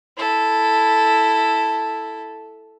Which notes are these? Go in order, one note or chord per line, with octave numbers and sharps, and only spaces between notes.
E4 A4